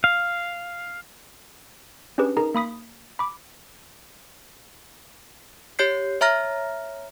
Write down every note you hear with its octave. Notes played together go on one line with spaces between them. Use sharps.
F5
C#4 D4 G4 G#4 B4
D#4 G#4 A#4 A#5
A#3 B5 D#6 B6
B5 D6
G4 C#5 G6 C7
C#5 E5 A#5 F6 A#6